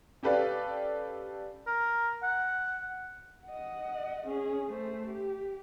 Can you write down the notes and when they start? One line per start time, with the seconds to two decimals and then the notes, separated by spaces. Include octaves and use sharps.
0.23 C#4 G4 A4 B4 D5 F5
1.67 A#4
2.23 F#5
3.46 D#5 F#5
4.27 C#4 G#4
4.67 A3 C5
5.07 G4